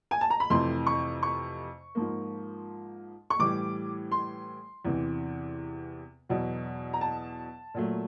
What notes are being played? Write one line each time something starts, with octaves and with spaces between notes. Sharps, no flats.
G#5
A5
A#5
B5
F2 C3 E3 A3 C6
C#6
C#6
G#2 F3 A#3
C#6
A2 E3 G3 D6
C6
E2 C3 E3
E2 B2 F#3
A#5
A5
A#2 F#3 A3